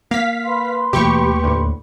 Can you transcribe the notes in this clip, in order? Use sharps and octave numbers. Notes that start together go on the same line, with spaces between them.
A#3 F5 B6
B4 B5 C6
D#2 B2 E3 A3 G4 C#6
D2 A2